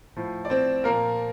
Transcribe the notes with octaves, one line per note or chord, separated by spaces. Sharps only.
A2 F3
D5
C4 C5
A#2 F3 A#3 A#4